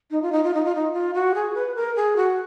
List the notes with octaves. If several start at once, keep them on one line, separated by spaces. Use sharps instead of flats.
D#4
F4
D#4
F4
D#4
F4
D#4
F4
F#4
G#4
B4
A#4
G#4
F#4